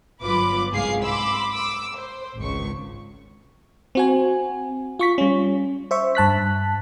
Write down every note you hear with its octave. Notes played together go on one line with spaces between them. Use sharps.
G1 F#3 F4 B4 B5 D6
C2 G#2 G#4 F5 C7
B5 C6 D6 E6
D6 E6
C5
G#1 C#2 C#6
C4 F#4 G#5
F4 C#6 B6
G3 C#4
C5 E5 C#6
G2 A5 F#6 B6